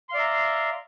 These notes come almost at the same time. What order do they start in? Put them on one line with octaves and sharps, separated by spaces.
C6 F5 D5 E5 A#5